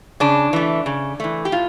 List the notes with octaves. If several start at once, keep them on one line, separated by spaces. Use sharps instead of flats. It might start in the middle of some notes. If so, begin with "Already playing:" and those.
C#3 D4
E3 A3
C#3
E3 A3
G4
A2 F4